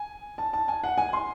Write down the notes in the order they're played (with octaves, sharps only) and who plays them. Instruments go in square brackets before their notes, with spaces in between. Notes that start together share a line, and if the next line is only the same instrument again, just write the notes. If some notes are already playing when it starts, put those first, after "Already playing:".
Already playing: [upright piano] G#5
A5
A5
G#5
F#5
G#5
C6